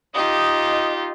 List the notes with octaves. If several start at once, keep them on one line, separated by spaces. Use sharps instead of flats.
D#4 F4 G4 D#6